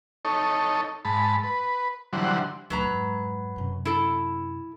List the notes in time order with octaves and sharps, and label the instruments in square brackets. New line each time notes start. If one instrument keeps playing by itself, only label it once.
[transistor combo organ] D#4 A4 C#5
G#2 A5 B5
B4
D3 E3 F#3 G3 C5 F#5
[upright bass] D1 D#3 [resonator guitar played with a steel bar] F#3 B4 A#5
[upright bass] F2 G#2
F#2 C3
[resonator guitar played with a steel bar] E4 A4